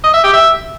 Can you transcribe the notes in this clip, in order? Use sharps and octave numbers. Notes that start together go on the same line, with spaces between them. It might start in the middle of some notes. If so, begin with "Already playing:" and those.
D#5
E5
G4
E5